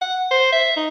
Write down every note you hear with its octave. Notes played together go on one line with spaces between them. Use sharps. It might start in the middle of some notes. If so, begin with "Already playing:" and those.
F#5
C5
E5
D#4